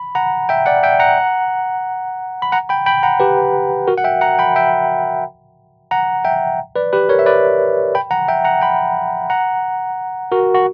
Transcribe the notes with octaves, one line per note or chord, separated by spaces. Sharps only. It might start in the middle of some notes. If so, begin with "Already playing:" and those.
Already playing: B5
F#5 A#5
E5 G5
D5 F#5
E5 G5
F#5 A#5
B5
F#5 A#5
G5 B5
G5 B5
F#5 A#5
G4 B4
F#4 A#4
F#5
E5 G5
F#5 A#5
G5 B5
E5 G5
F#5 A#5
E5 G5
B4 D5
G4 B4
A#4 C#5
E5
B4 D5
G5 B5
F#5 A#5
E5 G5
F#5 A#5
G5 B5
F#5 A#5
F#4 A#4
F#4